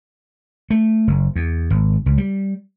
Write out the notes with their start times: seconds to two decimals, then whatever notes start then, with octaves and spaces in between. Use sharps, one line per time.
0.70 A3
1.07 F#1
1.36 E2
1.70 G#1
2.06 C#2
2.18 G3